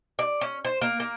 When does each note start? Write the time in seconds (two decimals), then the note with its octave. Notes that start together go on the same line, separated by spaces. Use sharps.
0.19 D5
0.41 C#4
0.65 C5
0.81 A#3
1.00 A#3